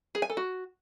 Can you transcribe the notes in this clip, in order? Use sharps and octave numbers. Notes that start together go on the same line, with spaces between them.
G#4
G#5
A4
F#4